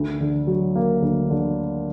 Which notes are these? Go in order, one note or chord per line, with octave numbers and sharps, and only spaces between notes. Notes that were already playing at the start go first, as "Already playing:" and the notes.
Already playing: D2
D3
F#3
A#3
D2
D3